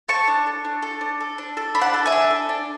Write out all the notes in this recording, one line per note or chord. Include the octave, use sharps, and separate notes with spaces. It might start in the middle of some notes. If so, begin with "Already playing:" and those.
A4 A5 C#6
D4
A4
D4
A4
D4
A4
D4
A4
D4 B5
F#5 A5
A4
E5 G#5
D4
A4
D4